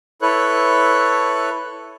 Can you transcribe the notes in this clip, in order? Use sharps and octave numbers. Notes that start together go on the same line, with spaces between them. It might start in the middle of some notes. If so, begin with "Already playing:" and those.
E4 A4 B4 C#5 F#6